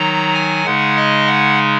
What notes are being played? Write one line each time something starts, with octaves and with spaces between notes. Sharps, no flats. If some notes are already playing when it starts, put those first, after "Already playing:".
Already playing: D#3 F#3 D#4 A#5
G#5
C#3 G#3 D#4 F#5
D#5
F#5